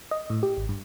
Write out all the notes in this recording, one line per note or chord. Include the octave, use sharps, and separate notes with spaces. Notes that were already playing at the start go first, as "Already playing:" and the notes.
D#5
A2
G4
G#1
G2